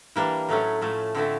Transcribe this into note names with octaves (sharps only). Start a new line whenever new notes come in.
E3 G3 A#3 D4
A2 F#3 A3 C#4
A2 F3 A3
D3 F3 A3 C4 E4